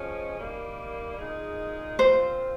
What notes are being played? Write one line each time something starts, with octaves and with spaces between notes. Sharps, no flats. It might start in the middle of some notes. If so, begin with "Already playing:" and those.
Already playing: F3 G#3 C#4
D#3 G3 A#3
A#2 G#3 D#4 G#4
A#2 F3 C4 F4 C5